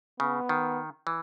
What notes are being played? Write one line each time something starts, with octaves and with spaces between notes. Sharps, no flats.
C#3 B3
D#3
E3